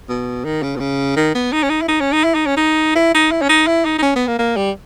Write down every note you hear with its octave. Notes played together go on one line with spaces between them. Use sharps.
B2
D#3
C#3
B2
C#3
D#3
B3
D#4
C#4
D#4
E4
D#4
C#4
D#4
E4
D#4
C#4
D#4
E4
D#4
E4
C#4
D#4
E4
D#4
D#4
C#4
B3
A#3
A#3
G3